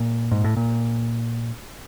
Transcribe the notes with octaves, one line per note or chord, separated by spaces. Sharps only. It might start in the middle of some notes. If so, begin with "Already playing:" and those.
Already playing: A#2
G#2
A2
A#2